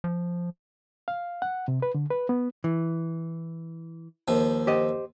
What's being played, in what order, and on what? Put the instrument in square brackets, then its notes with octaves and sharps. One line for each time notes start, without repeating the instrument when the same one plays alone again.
[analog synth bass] F3
[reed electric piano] F5
F#5
C3
B4
D3
B4
B3
[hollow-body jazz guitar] E3
[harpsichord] D#2 F3
[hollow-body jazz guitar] G4 C5 D#5